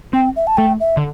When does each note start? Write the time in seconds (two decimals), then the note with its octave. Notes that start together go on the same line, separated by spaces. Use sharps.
0.13 C4 G5
0.36 E5
0.47 A5
0.57 A3 G5
0.80 E5
0.97 D3